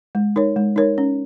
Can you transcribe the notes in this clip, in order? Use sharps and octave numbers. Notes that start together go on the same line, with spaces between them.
G#3
D#4 A#4 C#5
G#3
D#4 A#4 C#5
C#4